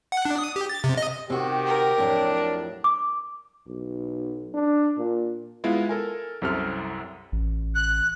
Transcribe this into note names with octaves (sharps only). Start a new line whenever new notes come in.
F#5
D4
D#6
G4
A6
C3
D#5
C3 D#3 F#4 G4
A#4
F2 A2 F#3 D4
D6
B1
D4
A#2
G#3 B3 E4 F4
A4 A#4 G#5
C2 F#2 C3 A4 F6
A1
F#6